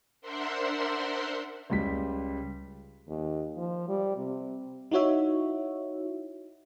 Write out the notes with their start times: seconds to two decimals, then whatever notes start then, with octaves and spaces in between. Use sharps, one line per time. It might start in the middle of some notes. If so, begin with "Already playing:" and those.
0.22 D4 A#4 C5 E5 F#5 C6
1.70 C#2 G3 B6
3.08 D#2
3.57 F3
3.88 G3
4.17 C3
4.91 D#4 E4 F#4 C#5 E5